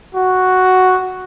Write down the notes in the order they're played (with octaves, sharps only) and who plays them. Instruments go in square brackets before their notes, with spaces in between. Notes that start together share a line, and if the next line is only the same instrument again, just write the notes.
[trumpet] F#4